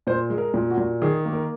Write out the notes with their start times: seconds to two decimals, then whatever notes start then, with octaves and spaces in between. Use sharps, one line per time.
0.07 A#2 C5
0.30 G#3
0.38 A#4
0.54 A#2
0.70 F#4
0.77 A#2
1.02 D#3 G#4
1.25 A#3
1.33 A#4